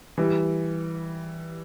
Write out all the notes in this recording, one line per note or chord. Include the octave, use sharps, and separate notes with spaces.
E3 G3